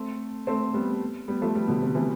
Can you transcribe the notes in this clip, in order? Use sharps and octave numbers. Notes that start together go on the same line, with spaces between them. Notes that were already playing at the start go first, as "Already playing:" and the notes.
Already playing: A3 C4
A3 C4
G3 B3
G3 B3
F3 A3
G3 B3
B2 D3
C3
C3 E3